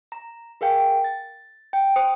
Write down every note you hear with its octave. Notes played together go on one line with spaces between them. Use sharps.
A#5
G#4 A#4 F5 G5 G#5
A6
G5
C5 D#6 C#7